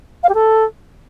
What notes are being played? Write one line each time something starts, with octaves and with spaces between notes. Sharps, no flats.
F5
G4
A4